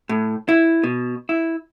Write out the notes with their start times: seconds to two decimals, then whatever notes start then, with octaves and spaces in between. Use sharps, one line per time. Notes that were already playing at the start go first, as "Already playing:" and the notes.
0.09 A2
0.49 E4
0.83 B2
1.29 E4